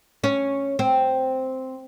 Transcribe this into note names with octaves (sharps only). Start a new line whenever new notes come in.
C#4
C4